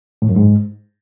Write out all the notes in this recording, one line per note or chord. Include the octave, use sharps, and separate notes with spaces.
A2
F#2
G#2